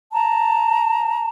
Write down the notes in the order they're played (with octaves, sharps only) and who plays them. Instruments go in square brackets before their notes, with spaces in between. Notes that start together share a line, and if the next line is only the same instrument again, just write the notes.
[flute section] A5 A#5